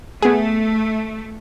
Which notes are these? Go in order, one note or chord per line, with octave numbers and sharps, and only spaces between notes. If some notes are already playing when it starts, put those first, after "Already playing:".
A3 B3 G#4